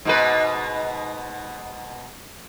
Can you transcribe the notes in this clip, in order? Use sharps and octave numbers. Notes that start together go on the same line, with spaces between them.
G#2 B2 B4